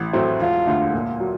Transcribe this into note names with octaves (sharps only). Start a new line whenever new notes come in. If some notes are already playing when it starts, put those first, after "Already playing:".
Already playing: A1
A2 F#3 A3 C4
E1 F4
D2 D3
A#2
F#3